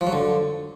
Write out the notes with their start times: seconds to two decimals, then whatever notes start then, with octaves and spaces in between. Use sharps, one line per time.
0.01 F3
0.07 F#3
0.13 D3